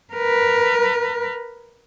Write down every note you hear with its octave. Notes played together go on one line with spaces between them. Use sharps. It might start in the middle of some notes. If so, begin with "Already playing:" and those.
A#4 B4